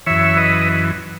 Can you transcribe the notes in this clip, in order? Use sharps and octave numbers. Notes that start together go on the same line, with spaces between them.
F#2 E3 C#5 E5
B4 D#5